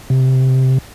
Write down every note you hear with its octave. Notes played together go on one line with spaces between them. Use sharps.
C3